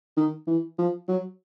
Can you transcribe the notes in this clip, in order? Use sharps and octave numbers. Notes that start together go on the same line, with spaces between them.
D#3
E3
F3
F#3